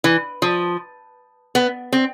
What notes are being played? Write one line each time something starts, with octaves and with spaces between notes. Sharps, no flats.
E3
F3
B3
C4